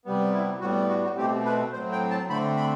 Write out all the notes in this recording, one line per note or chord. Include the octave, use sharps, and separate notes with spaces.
C3 G3 B3
E4
A2 G3 B3 F#4
F#4
F#4
B2 A3 C4 G4
B4
A2 F#3 C4 C5
G5
A5
D3 A3 C4 B5
B5